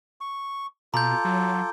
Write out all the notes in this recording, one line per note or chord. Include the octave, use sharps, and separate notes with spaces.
C#6
B2 F4 A4 A#5 D6 G6
F#3